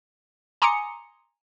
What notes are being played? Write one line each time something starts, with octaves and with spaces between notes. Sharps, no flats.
G#5 A#5 C6 D6 D#6 C#7